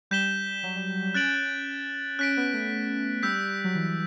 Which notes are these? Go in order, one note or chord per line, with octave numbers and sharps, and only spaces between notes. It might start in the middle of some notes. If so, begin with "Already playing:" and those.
G3 G6 B6 E7 G7
F#3
G3
G3
G3
C#4 F#6 A6 D7 F#7
C#4 F#6 B6 D7
B3
A3
G3 E6 G6 B6
F#3
E3